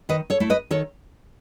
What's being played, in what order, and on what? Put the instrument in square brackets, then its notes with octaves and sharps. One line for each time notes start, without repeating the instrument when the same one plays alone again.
[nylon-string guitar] D#3 B4 D#5
A4 C#5
A3 E4
B4 D#5
D#3 A4 C#5